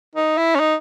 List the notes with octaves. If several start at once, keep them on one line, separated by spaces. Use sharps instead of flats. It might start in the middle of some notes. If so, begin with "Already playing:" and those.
D#4
E4
C#4
D#4